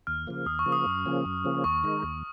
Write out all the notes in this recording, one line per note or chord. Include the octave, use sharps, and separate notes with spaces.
D#2 F6
C#3 F3 A#3
D#2 D#6
C#6
C#3 F3 A#3
D#6
F#2
C#3 F3 A#3 C#4
F#2
C#3 F3 A#3 C#4
D#2 C#6
D#3 G#3 D#4
D#2